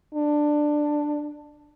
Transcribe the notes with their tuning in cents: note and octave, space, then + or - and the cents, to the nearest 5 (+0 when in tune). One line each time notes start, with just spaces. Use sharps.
D4 +10